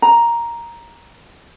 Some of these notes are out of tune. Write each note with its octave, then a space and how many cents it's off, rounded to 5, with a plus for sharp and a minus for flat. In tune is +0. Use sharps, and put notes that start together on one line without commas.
A#5 +5